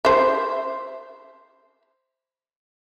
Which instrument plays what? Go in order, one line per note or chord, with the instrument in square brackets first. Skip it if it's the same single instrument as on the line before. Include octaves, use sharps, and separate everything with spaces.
[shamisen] C5 E5